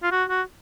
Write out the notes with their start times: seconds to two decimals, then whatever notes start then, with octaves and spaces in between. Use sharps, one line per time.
0.03 F4
0.11 F#4
0.29 F#4